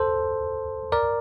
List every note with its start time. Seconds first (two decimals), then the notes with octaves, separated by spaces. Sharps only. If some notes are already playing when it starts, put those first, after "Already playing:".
Already playing: A4 C5
0.92 A#4 D5